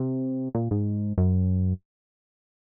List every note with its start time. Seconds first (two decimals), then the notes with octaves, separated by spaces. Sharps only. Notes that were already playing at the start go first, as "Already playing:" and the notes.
Already playing: C3
0.55 A#2
0.71 G#2
1.18 F#2